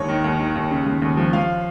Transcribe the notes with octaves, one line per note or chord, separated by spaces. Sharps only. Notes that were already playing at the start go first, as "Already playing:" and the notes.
Already playing: D#2 C#5
D#3
D#2
D#3
D#2
C#3
D#2
D#2
F3
F3 F5